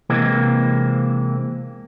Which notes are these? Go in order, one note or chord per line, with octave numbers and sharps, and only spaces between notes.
C3 E3 G#3 A#3 C4